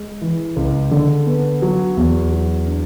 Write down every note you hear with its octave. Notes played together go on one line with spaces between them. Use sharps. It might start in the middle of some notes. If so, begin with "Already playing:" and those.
Already playing: G#3
E3
C#2
D3
B3
F#3
E2
F#3
D4